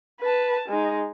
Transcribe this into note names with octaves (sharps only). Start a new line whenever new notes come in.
B4 A5
G#3 D#4